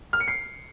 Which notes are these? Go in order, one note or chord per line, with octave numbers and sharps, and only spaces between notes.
F6
C#7
C7